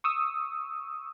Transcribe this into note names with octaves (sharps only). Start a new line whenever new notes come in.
C#6 D#6 E6